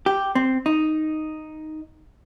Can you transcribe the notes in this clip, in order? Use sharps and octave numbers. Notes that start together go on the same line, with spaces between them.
G4
C4
D#4